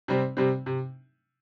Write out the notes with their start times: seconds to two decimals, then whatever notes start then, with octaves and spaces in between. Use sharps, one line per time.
0.08 C3 G3 C4
0.37 C3 G3 C4
0.66 C3